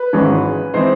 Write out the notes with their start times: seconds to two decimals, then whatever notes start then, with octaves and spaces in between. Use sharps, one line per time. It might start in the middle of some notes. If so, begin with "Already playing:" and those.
Already playing: B4
0.13 G#1 G#2 E3 G#3 C#4
0.74 E3 G#3 C4 D#4 C5